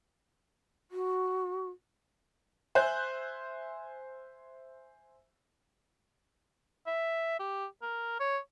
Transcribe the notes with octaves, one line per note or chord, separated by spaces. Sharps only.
F#4
C5 E5 G#5 F#6 G6
E5
G4
A#4
C#5